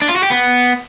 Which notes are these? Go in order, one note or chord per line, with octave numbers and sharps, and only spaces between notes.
D4
F4
F#4
G4
B3